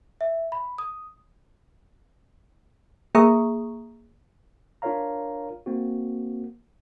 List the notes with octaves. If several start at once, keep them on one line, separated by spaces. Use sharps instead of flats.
E5
B5
D#6
A#3 G#4 E5 A#5 C#6 D#6
D4 F4 A#4 C#5 F5 A#5
A#3 C4 F#4